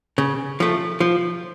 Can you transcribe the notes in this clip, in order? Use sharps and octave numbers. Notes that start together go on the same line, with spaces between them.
C#3
F3 A3
F3